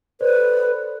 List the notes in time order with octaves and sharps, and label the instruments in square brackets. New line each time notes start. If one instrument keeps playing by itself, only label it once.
[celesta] A4 C5 D5 [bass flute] B4